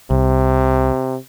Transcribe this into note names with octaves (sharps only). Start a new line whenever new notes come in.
C2 C3